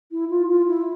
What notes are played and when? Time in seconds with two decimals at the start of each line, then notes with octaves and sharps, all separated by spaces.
0.12 E4
0.30 F4
0.49 F4
0.68 E4